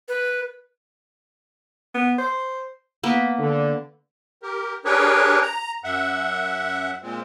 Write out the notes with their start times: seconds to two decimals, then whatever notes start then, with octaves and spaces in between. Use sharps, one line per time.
0.08 B4
1.94 B3
2.18 C5
3.03 A#3 B3
3.39 D3
4.43 G4 A#4
4.85 D4 G4 G#4 A#4 B4 C#5
5.42 A#5
5.84 F#2 E5 F#5
7.02 A#2 G#3 C4